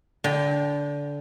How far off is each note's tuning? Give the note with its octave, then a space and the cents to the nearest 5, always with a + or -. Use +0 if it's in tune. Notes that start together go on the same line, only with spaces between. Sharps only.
D3 -20 G5 +10